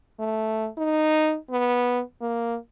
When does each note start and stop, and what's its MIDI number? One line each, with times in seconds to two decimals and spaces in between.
0.19 0.69 57
0.78 1.36 63
1.50 2.01 59
2.21 2.57 58